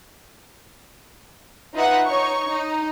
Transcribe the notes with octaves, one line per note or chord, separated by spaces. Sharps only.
D#4 F4 B4 D#5 E5 F#5
D#4 C#5 C#6
D#4